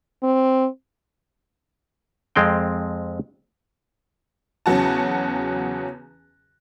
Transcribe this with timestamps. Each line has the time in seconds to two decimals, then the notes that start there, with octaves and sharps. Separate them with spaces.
0.23 C4
2.36 F2 G#3 C4 G5
4.66 E2 C#3 F#3 F#4 A5